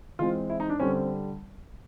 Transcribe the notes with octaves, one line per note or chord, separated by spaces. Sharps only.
E3 G#3 C4 F4
E4
D#4
D4
D3 G3 C4 C#4